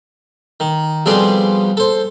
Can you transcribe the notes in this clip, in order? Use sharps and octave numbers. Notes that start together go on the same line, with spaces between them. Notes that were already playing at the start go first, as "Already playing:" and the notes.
D#3
F2 B2 G3 G#4 D5 C6
A4 C5